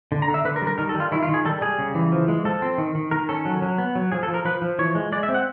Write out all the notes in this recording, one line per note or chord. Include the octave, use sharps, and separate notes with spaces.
D3
A#5
D3
E5
D3 B4
A#4
G3
A#4
D#3 A#4
A4
G3
F4
D#3 E4
F4
D#3 G#4
G3 A4
G3 G#4
C#3
E3
F3
G#3
F3 A4
C4
D#3
D#3
D#3 A#4
C#4 A4
F#3
F#3
B3
F#3
F3 G#4
A4
F3
A#4
F3 B4
F3
E3 C#5
G#3
G#3 D5
E5
C4
F#5